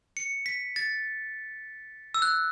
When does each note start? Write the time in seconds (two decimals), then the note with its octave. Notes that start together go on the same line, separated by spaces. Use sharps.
0.17 C#7
0.46 B6
0.76 A6
2.14 E6
2.22 F#6